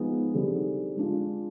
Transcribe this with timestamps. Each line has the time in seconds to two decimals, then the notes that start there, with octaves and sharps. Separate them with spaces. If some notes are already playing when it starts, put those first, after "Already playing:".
Already playing: F3 G#3 B3 D#4 G#4
0.34 D3 G3 C4 D#4 G#4
0.97 G#3 D4 F4